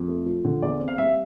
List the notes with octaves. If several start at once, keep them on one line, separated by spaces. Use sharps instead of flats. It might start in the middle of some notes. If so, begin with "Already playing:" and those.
Already playing: F2
A3
F3
D3
E2 D5
C4
F5
G3 E5